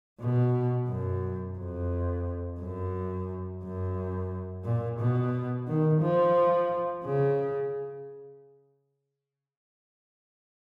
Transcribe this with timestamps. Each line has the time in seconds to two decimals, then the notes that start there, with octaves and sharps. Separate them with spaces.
0.20 B2
0.88 F#2
1.58 F2
2.60 F#2
3.63 F#2
4.64 A#2
4.99 B2
5.68 D#3
6.02 F3
7.04 C#3